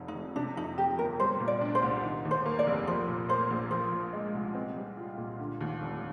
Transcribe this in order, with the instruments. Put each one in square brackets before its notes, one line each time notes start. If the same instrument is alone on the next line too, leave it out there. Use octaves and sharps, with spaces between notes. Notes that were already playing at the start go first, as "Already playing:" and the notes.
Already playing: [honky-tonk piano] F1 F2 G#2
[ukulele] D#4
[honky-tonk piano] F1
[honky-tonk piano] C3 [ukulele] D4
[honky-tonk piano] F2 [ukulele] D#4
[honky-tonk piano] F3 [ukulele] G4
[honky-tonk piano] G1 [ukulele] A#4
[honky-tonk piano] G3 [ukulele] C5
[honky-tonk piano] A#2
[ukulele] D5
[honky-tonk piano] D4
[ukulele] C5
[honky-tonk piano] C2
D#3
D#2
[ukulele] C5
[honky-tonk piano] A#3
[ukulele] D5
[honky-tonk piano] F1
[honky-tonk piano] F3 [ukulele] C5
[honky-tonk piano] A#2
[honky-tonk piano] A#3 [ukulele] C5
[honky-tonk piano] A#1
[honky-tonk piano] F3 [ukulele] C5
[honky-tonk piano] A#2
G#3
C2
C4
G3
F4
A#2
D3
D#2
F1